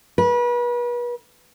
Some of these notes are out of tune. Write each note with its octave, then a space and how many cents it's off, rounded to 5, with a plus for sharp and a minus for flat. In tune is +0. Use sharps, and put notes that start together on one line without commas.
B4 -35